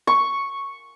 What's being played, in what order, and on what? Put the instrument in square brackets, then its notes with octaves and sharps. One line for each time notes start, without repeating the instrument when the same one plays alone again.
[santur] C#6